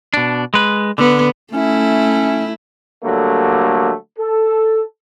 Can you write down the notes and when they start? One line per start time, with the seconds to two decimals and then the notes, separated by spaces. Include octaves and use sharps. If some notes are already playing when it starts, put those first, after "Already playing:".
0.14 B2 D4
0.54 G#3 B4
0.98 D3 B3
1.54 A3 C#4 E4
3.04 D3 F#3 G3 A3 A#3
4.19 A4